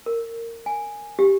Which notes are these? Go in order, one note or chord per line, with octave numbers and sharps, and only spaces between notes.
A#4
G#5
G4